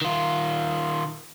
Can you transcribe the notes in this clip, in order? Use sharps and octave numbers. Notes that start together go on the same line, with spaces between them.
D#3 F4